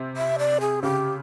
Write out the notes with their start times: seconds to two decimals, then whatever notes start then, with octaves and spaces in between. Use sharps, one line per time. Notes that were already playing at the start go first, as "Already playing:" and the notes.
Already playing: C3
0.17 E5
0.39 D5
0.61 G#4
0.82 C#3 G4